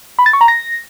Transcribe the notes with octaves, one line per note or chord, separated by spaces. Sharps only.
B5
A6
C#6
A#5
A#6